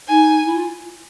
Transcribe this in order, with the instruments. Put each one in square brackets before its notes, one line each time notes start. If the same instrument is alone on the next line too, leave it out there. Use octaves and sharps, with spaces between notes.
[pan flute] D#4 [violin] G#5
[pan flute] E4
F4